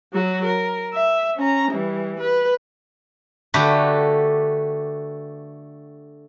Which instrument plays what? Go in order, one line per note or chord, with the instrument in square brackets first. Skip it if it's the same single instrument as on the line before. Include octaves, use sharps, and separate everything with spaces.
[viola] F#3 F#4
A#4
E5
C#4 A#5
E3 G3
B4
[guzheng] D3 A3 F#4 G4 B4